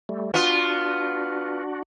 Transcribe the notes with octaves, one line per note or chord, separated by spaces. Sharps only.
G3 A3
B3 D4 F4 F#4